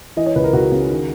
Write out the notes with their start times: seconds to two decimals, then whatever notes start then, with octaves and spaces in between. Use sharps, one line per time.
0.17 E3 D#5
0.26 C#5
0.35 C#2 B4
0.44 A#4
0.53 C#2 F#4
0.72 C#3
0.90 D#3